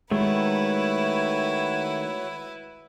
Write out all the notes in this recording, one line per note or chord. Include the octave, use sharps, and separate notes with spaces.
D#3 G#3 A3 E4 F#4 B4 C#5